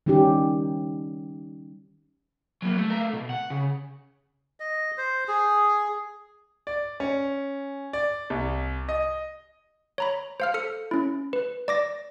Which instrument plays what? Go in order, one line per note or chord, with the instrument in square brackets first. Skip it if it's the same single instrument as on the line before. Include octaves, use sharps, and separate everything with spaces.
[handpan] D#3 G3 C#4 D#4 G4
[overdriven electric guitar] F#3 A#3
A3
A3 A#4
B2
F#5
C#3
[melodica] D#5
C5
G#4
[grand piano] D5
C#4
D5
C2
D#5
[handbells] C#5 A#5 B5
C5 F5 F6
A4 F6 C#7
C#4 E4
B4
D5 D6 A#6